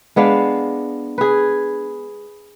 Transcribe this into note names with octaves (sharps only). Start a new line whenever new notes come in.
G#3 B3 D4 F5
G#4 B4